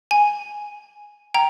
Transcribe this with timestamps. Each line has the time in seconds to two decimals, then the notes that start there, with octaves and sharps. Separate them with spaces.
0.11 G#5
1.34 G5 A#5